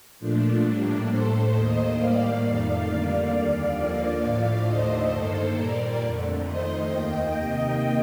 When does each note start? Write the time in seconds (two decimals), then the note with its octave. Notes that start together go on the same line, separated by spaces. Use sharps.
0.19 A#2 F3 A3 D4
0.63 A2 G3 A#3 D4
1.08 A2 A3 A4 C5
1.53 D#2 D#3 A#3 C5 D#5
1.98 A2 G3 A#3 D5 F5
2.43 F2 D#3 A3 D5 F5
2.88 F2 D3 G3 A#3 D5 F5
3.32 D#2 D3 G3 D5 F5
3.77 D#2 D3 F3 A#3
4.22 A2 F3 A3
4.66 D#2 D3 A3 C5 D#5
5.11 G2 D#3 A#3 A4 C5
5.56 A#2 G3 A#3 A#4 D5
6.00 F2 D3 A3
6.45 F2 D#3 A3 C5 D#5
6.91 D#2 D#3 A#3 D#5 G5
7.36 C3 D#3 A#3